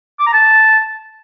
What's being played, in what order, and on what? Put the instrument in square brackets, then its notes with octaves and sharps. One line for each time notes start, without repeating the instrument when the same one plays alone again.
[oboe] D6
A#5
A5